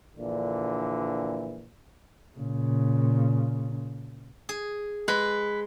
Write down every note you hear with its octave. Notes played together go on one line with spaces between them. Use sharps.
A#1 A#2 D3 E3
A#2 C#3
G#4
G#3 B4